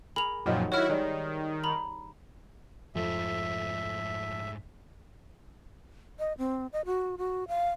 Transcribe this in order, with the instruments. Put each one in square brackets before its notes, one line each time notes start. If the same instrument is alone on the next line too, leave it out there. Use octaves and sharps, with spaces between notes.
[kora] G#4 A#4 [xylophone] B5 F7
[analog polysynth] F#2 A#2 F3 [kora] D#3 F#3 G4
[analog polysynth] E4 F#4 [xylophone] C#5 F6
[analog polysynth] D#3 [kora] G3 G#3 G#4
[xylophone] A#5 B5
[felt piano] F2 [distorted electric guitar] G#2 A3 [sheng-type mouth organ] E5
[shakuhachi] D#5
C4
D#5
F#4
F#4
F5